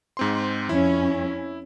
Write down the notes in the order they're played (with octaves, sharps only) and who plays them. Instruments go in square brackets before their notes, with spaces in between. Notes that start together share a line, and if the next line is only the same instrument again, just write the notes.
[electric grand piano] G#2 C4 C6
[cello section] F2 C#4 [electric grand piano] E4